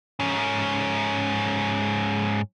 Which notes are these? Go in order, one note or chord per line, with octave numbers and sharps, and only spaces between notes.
G#2 C#4